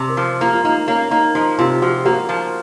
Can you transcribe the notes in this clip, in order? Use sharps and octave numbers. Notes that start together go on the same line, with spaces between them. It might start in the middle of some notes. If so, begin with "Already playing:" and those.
Already playing: C3 C5
A#4
F3
A#3 F4
F4
A#3 D#4
A#3 C#4
A#3 D#4
F3 D#4
C3 F4
F3 F#4
A#3 F#4
F3